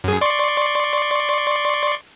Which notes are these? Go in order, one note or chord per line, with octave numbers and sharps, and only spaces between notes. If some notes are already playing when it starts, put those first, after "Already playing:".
F#2 G#4
D5 C6 C#6